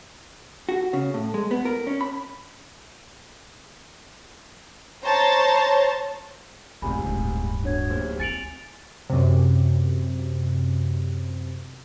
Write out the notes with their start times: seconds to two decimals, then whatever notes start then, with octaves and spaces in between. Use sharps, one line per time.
0.69 F#4
0.93 C#3
1.14 A2
1.34 G#3
1.51 B3
1.65 A#4
1.87 C#4
2.01 B5
5.03 C5 C#5 A5 A#5
6.82 A1 E2 G#2 C3 F#3 G#5 B5
7.06 D1 G2
7.64 B2 D4 C#5 G#6
7.90 D1 D#2 C5
8.20 C4 G#5 A6 C#7 D7 F7 F#7
9.10 F#2 C3